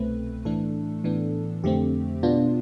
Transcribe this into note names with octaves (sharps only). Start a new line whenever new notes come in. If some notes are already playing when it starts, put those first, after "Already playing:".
Already playing: C2 B2 A3 C4 B4
A2 E3 A3 D4 A4
A2 E3 B3 D4
F2 D3 A3 C4 G4
B2 B3 D4 F4